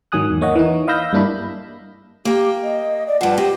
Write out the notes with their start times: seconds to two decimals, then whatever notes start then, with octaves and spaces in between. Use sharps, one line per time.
0.12 G#2 D#3 F#3 G#5 D#6 F#6
0.30 E2
0.41 A#3 C#5 D#5 F#5
0.55 E3 D#4
0.87 D#5 F5 B5 E6 G6 A#6
1.13 G2 A#3 D4 E4 B5
2.25 A#3 G4 G5
2.63 D#5
3.07 D5
3.21 G2 F3 F#5
3.38 C4 G4 D#5